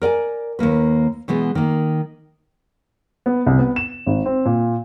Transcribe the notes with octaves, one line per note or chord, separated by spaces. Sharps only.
A#4 D5 G5 G#5
D#2 B2 A#3 B4
B2 E3 G#3 B3
D#3 A#3
B3
C2
B3
E7
G#1
C4
A#2